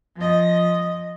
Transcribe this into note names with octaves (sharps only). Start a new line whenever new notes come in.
F3 D#5